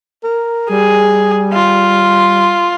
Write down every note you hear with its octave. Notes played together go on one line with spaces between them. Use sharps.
A#4
G3 G#4
F4